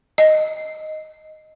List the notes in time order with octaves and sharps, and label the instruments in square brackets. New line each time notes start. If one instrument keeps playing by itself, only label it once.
[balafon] D#5